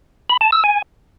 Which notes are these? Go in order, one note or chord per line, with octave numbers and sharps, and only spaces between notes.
B5
A5
E6
G#5